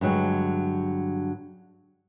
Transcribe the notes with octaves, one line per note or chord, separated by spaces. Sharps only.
G2 D3 F#3 G#3